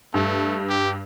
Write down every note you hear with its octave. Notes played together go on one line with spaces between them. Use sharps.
G2 A3
G4